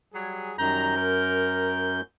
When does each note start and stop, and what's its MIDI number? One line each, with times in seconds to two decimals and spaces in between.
0.13 0.54 54
0.13 0.54 55
0.13 0.54 68
0.59 2.01 42
0.59 0.96 51
0.59 0.96 55
0.59 0.96 82
0.59 2.01 91
0.97 2.01 70